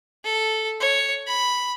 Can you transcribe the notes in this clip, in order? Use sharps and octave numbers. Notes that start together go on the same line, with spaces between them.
A4
C#5
B5